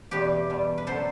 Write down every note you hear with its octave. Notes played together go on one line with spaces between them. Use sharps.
E2 B2 G3 G4 B4
E2 B2 G3
B4
D3 F#3 A4 C5